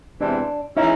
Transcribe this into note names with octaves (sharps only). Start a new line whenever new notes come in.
E2 C3 E3 G#3 C4 D4
E3 G#3 C#4 D#4 E4